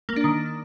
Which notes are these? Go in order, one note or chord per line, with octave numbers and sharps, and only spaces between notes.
A#3
D4
D#3